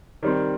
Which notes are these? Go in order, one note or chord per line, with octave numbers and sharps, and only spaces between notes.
D#3 G3 C4